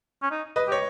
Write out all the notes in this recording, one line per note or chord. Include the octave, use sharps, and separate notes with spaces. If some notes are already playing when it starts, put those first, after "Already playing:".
C#4
D#4
B4 D#5
G4 C#5